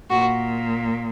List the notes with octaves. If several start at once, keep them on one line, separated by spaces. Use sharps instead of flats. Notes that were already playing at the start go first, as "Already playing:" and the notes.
A#2 F#4